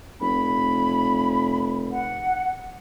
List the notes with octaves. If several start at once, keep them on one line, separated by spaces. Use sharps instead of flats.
F1 B5
F#5